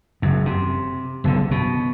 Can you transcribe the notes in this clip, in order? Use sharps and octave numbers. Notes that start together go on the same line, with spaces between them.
F#1 F#2
C3
F#1 B1 B2 D3
B2